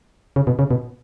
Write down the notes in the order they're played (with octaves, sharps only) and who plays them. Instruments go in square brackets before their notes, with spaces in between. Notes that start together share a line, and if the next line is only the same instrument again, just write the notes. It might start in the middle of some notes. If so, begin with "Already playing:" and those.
[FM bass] C#3
B2
C#3
B2